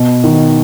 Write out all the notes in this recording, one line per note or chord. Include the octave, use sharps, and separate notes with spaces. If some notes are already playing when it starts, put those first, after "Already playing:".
Already playing: B2
D#3